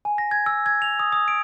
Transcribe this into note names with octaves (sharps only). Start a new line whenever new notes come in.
G#5
A#6
G#6
E6
G#6
F7
D#6
D#6
D7